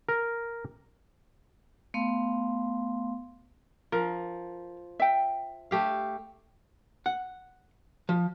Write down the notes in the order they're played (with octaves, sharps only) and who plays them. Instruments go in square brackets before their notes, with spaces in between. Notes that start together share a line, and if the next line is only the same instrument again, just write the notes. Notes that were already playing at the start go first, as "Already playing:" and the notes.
[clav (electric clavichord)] A#4
[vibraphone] A3 B3 F5 C6
[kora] F3 [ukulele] A#4
[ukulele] E5 G5
[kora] A3 G4 F5
[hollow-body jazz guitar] F#5
F3